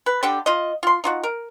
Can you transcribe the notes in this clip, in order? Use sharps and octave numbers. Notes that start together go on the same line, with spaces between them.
B4
D3 G3 D4 G4
F4 D#5
F4 C6
D#4 F4 F#4
A#4